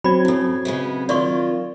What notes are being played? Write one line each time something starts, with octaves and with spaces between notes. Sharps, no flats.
F#3 C4 B5 G#6
G2 C#3 E4 A4
C#3 G#3 B3
D#3 F4 D5 C6 C#6